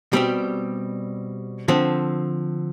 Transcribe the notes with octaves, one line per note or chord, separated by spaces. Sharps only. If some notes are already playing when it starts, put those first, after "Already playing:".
B2 G3 C4 G4
D3 F3 C4